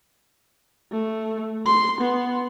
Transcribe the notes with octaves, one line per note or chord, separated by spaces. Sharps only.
A3
C6
B3